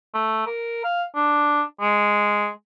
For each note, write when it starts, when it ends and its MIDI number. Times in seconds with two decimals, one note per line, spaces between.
0.14 0.43 57
0.47 0.83 70
0.84 1.04 77
1.15 1.62 62
1.81 2.49 56